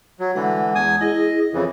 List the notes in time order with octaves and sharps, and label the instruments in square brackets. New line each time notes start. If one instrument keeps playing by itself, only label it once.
[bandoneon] F#3
[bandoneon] D3 E3 [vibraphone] G#3 F#5
[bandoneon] E2 G#5 D#6
[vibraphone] E4 G#4 [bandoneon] D#5
[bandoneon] F2 C#3 E3